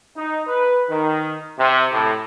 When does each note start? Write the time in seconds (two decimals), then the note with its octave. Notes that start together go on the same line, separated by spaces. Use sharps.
0.16 D#4
0.47 B4
0.90 D#3
1.58 C3
1.92 A2